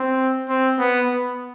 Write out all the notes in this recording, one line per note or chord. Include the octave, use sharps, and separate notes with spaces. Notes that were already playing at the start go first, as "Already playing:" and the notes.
Already playing: C4
C4
B3
B3